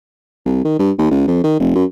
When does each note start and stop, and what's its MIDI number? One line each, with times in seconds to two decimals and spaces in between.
0.46 0.60 36
0.65 0.77 51
0.79 0.91 43
0.98 1.09 39
1.11 1.23 37
1.27 1.41 41
1.43 1.55 51
1.59 1.72 29
1.75 1.84 42